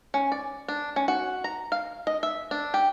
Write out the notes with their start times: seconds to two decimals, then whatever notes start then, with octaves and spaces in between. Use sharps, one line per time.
0.14 C#4
0.32 D5
0.68 D4
0.96 C#4
1.08 F#4
1.44 A#5
1.72 F5
2.07 D#5
2.23 E5
2.51 D4
2.74 G4